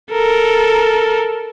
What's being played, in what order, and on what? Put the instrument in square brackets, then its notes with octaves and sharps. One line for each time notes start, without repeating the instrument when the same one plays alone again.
[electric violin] A4 A#4